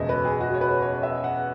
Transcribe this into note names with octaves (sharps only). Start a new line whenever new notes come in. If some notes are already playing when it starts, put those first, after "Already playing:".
Already playing: F#1 E2 B2 G#3 D#5 E5
B4
G#4
F#4
C#5
B4
C#5
E5
F#5